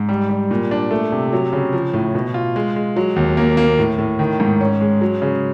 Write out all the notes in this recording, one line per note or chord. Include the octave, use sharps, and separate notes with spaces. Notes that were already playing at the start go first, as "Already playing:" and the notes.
Already playing: G#2
G3
G3
A#2
D4
A3
C3
F#3
C#3
F3
A2
B2
F4
G#3
G#3
F#3
D#2
A#3
A#3
A2
A2
D#3
G#2
C#4
G#3
F#3
C#3